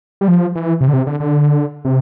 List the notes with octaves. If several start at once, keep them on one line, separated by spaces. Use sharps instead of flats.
G3
F3
E3
C3
D3
C3
D3
D3
C3